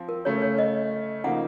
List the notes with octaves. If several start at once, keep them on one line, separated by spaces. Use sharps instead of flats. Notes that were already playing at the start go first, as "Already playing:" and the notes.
Already playing: F3 C4
A#4
C#3 A3 C#4 C#5
C#5
D#5
C#3 F3 A#3 D#4 F#5